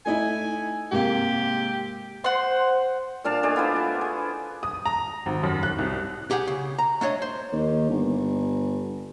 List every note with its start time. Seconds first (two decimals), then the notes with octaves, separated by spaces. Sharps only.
0.06 A3 D#4 E4 G#5
0.92 G#2 C3 A#3 G4
2.24 C5 F#5 C6
3.24 A#2 D4 F5 A5
3.43 A3 D4 D#5 G#5
3.56 B3 E4 F4 C5
3.76 F5
4.01 G#4
4.63 D#6
4.86 A#5
5.26 G#1
5.43 F#2
5.63 F#6
5.79 C2
6.31 G4 G#4 F#5 G5
6.47 C#3
6.78 A#5
7.01 A3 D4 C#5 D#5
7.22 C5
7.52 D#2
7.90 G1